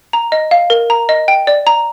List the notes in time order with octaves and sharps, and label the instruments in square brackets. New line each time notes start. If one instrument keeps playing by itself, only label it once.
[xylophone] A#5
D#5
F5
A#4
A#5
D#5
G5
D5
A#5